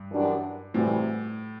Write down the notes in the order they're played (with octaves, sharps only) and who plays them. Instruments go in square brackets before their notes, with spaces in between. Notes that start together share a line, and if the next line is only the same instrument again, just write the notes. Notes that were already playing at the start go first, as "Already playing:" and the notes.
Already playing: [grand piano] G2
[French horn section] F#2 E3 G3 D4 F#4
[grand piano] A2 [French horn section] C3 E3 G3 C4 F#4